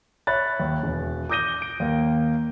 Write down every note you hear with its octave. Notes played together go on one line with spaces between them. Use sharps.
C#5 E5 B5 F#6 A6
D#2
E1
D6 D#6 G6 A#6 D#7 G7
D7
D#2 A#3